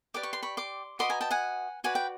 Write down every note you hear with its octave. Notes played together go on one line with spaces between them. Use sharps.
G4 B4 D5 D6
C#6
C6
B5 C#6
C6 D6
F#4 B4 D#5 C6 D6
G#5 A#5
G5 A5
F#5 G#5
F#4 B4 D5 G#5
G5